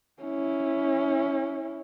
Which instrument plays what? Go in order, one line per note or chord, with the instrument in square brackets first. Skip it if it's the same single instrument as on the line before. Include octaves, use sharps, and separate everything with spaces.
[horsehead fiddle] C#4 E4